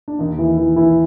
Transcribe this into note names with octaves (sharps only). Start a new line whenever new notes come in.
D4
D#2 D#3 D#4
E3 E4
E3 E4
E3 E4